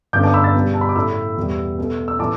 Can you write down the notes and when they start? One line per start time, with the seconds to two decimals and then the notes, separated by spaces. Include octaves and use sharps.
0.13 G2 D3 B3 D6 G6
0.23 A5 D6
0.34 B5 E6
0.44 E6 A6
0.55 B2 G3 B3
0.74 A5
0.81 B5
0.89 D6
0.95 A2 A3 B5 E6
1.37 E2 B2 G3 B3
1.78 B2 A3
2.08 E6
2.19 A2 E3 A5 D6